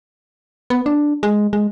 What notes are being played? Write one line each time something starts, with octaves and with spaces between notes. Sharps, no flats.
B3
D4
G#3
G#3